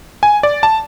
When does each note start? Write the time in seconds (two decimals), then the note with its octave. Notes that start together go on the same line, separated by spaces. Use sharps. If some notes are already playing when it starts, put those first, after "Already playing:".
0.23 G#5
0.43 D5
0.63 A5